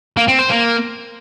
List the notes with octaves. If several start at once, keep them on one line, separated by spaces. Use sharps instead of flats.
A#3
C4
C5
A#3